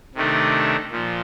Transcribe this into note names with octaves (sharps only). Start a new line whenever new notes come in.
C3 D#3 A3 D4
A#2 F3